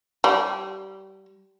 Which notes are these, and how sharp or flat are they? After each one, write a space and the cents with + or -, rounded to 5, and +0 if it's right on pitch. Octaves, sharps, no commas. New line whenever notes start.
G3 -25